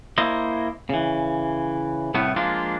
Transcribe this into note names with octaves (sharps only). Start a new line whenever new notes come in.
A#3 E4 C5 D#5
C#3 E3
C2 A2 A3 B3
F3 G#3 A#3 D4 F4